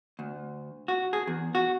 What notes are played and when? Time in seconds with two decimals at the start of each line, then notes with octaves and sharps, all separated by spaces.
0.19 D2
0.88 F#4
1.13 G#4
1.27 E2
1.55 F#4